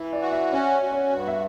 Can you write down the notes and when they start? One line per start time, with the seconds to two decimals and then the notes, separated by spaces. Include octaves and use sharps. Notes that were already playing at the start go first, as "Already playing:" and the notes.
Already playing: E3 E5
0.13 D5
0.22 F#4
0.32 E5
0.52 C#4 C#5
0.83 F#4
0.92 C#5
1.12 G2
1.27 E5